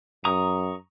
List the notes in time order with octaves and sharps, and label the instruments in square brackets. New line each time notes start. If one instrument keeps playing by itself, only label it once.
[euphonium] F#2 [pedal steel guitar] A#5 C#6 D#6